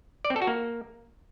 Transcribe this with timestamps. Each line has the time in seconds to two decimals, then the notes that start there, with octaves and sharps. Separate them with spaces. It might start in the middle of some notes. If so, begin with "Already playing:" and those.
0.25 D5
0.30 C4
0.36 A4
0.42 F#4
0.47 A#3